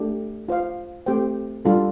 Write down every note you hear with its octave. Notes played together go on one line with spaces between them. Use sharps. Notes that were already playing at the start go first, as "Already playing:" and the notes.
Already playing: A3 D4 G4
F4 C5 F5
A3 C4 G4 C5 G5
G3 D4 F4 A4